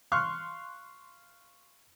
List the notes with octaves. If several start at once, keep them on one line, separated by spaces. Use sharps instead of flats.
F5 C6 C#6 F6 F#6